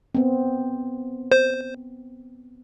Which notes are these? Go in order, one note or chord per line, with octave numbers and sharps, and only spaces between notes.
B3 C4
C5